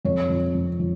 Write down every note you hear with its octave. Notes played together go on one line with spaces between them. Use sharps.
F2 C#5
F3
F2
F3